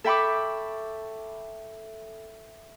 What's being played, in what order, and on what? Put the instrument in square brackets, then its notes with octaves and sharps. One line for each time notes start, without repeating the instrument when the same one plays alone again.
[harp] A4 E5 G5 B5 C#6 D6